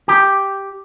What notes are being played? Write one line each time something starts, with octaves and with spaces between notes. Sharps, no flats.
G4